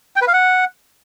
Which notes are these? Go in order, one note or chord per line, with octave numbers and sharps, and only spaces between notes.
G5
B4
F5
F#5